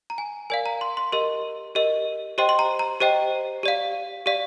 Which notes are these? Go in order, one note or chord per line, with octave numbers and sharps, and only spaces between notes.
A#5
G#5
A#4 D5 F5 G#5
A#5
C6
C6
G4 A#4 D#5 C6
G4 A#4 D#5
G4 C5 D#5 G5 C6
C6
A#5
A#5
G4 C5 D#5 G5
G4 D5 F5
G4 D5 F5